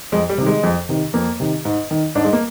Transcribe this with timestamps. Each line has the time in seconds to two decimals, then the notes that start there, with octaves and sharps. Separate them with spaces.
0.12 F2 G#3
0.29 G3
0.38 C3 D#3
0.46 G#3
0.63 F2
0.89 C3 D#3
1.14 F2 A#3
1.40 C3 D#3
1.65 G#2
1.91 D#3
2.15 G#2 D4
2.24 G#3
2.33 A#3